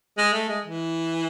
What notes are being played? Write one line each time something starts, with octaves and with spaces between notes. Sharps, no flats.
G#3
A3
G#3
E3